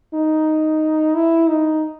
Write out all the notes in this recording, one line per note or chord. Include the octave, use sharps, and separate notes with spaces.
D#4
E4
D#4